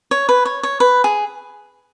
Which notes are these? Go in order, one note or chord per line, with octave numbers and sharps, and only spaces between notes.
C#5
B4
C#5
C#5
B4
G#4